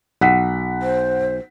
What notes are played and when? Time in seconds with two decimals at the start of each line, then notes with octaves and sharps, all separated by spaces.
0.21 B1 F#5 B6
0.82 C5